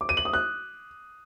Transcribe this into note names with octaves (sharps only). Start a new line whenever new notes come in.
D6
D#7
F#7
D#6
F#6